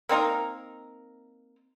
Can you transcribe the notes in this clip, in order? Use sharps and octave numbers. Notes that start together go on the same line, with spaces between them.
A#3 C4 D#4 A#4